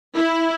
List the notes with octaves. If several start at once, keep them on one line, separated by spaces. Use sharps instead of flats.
E4